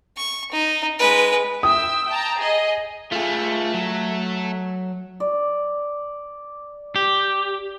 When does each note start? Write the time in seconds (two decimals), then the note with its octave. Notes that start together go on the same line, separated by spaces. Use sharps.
0.17 C#6
0.52 D#4
0.99 G#3 B4
1.63 E5 G5 D#6 E6
2.08 G5 A5 A#5
2.41 G#4 D#5
3.12 A3 F4 G#4
3.74 F#3
5.20 D5
6.96 G4